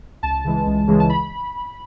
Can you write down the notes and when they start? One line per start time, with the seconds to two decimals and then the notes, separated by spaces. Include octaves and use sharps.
0.23 C#2 A5
0.44 C#3 E3 G#3
0.66 C#2
0.87 C#3 E3 G#3
1.00 A5
1.10 B5